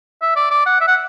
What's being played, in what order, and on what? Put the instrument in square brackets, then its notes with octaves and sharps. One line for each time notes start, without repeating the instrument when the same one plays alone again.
[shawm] E5
D5
D5
F#5
E5
F#5